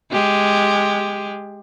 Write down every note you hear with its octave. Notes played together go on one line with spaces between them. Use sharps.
G#3 G4